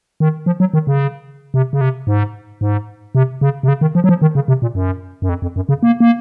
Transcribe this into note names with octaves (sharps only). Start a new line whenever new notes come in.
D#3
F3
F#3
D#3
C#3
C3
C#3
C3
G#2
G#2
C3
C#3
C3
C#3
D#3
F3
F#3
F3
D#3
C#3
C3
A#2
F#2
F#2
F2
F2
F#2
C#3
A#3
A#3